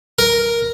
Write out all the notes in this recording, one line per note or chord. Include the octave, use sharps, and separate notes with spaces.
A#4